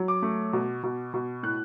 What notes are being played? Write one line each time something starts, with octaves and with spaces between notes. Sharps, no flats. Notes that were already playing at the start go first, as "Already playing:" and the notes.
Already playing: F#3
D6
A3
B2
B2
B2
A2 F#6